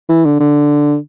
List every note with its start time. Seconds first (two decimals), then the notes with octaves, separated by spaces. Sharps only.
0.09 E3
0.25 D3
0.40 D3